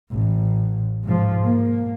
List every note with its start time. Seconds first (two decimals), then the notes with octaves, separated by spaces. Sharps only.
0.11 A1
1.04 G#2 F3
1.45 A#3